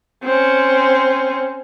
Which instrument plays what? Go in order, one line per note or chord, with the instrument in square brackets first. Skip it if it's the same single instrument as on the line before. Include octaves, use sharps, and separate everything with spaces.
[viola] C4 C#4